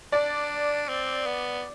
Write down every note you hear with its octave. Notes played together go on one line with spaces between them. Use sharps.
D4 D5
C4
B3